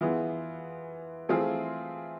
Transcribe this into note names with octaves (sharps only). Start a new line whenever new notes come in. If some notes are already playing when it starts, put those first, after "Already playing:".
E3 B3 F4 G#4
E3 A3 C4 F4 G#4